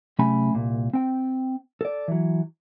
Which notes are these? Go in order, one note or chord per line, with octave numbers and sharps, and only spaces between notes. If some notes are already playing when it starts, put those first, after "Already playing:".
C3 F#3 A3 C#4 G#5 B5
C2 A#2
C4 G5
A4 D5
E3 F#3